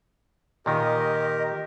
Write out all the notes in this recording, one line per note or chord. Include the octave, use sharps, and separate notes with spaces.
A#2 D#3 G4 A#4 D#5